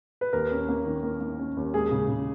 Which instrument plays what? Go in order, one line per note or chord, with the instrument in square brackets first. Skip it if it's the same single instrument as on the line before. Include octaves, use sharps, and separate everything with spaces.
[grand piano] B4
D#2 A#4
C#4
A#3
D#3
A#3
A#3
C#4
D#2
G#3 G#4
C#3
C#3